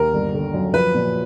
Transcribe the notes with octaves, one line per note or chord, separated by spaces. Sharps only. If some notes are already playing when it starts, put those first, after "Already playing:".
Already playing: D#2 A#4
G1
D3
F#2
F3 B4
A#2